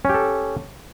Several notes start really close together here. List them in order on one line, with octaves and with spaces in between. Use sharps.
C#4 G4 A4